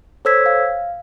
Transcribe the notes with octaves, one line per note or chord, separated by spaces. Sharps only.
A4 C5 C#5 E6 G#6 B6
F5